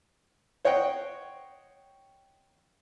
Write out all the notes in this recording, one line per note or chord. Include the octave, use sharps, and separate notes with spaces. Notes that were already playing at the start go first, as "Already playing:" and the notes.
C5 C#5 D#5 F#5 G5